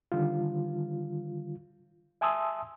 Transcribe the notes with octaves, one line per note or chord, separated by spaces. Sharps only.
D3 D#3 G3 F4
E5 G#5 A5 C6 D#6 E6